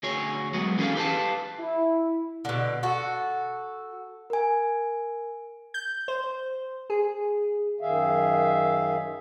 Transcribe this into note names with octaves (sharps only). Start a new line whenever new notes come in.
D2 F#4 G#4 C#5
F#3 G#3 B3
E3 C#4 G#4 A4 F5
G4 B4 F5 A5
E4
B2 D3
F#4 A4
A#4 G#5
G6
C5
G#4
F#2 D#3 G#4 E5 F5